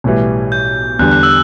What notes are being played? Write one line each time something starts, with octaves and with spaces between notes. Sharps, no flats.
B1 A2 E3 G3
G6
E2 D3 G3 F#6
F#6
E6